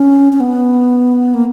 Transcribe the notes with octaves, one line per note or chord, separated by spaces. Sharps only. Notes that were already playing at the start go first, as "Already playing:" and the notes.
Already playing: C#4
C#4
B3
A#3